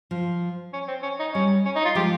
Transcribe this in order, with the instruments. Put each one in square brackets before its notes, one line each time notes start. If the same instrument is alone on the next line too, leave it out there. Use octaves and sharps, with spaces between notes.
[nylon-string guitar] F3
[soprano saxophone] C#4
C4
C#4
D#4
[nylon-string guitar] G3 [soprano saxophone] C#4
[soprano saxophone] C#4
D#4
F4
[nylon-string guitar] F3 G#3 [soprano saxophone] G4